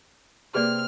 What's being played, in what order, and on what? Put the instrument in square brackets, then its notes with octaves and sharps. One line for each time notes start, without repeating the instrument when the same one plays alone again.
[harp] C3 A#3 [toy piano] G#4 B4 D5 [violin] F6